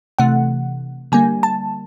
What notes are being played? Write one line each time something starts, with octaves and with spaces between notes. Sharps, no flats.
C3 E3 A3 F#5
D3 G3 A#3 G#5
A5